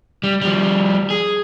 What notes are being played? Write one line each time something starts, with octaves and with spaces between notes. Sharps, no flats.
G3
F3 G3
G#4